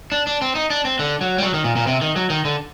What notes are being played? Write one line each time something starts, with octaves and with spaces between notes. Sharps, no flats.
D4
D4
C4
D#4
D4
C4
D3
F#3
G3
F#3
D#3
A#2
A#2
C3
D#3
F#3
D#3
D3